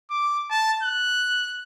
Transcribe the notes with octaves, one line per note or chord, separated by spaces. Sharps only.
D6
A5
F#6